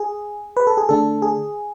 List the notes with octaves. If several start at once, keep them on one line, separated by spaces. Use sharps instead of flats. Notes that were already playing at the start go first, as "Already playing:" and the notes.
Already playing: G#4
B4
A4
G#4
D3 A3 D4 A4
G#4